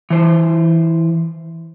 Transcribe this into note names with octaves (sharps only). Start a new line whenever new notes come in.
E3 C5